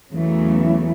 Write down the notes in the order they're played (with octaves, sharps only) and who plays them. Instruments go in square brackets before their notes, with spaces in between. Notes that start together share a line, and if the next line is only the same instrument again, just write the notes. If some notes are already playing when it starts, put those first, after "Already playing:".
[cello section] E2 C#3 F#3 A3 [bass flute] E3